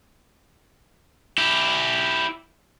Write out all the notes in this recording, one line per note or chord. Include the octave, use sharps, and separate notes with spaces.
E4 G4